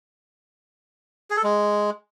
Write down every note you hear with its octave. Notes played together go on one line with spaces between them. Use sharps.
G#4
A4
G#3